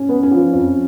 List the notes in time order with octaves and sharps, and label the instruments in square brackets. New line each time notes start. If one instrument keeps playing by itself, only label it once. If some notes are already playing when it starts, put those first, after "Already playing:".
Already playing: [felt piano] C#4
[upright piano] B3
[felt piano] C#4
[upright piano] F3
F2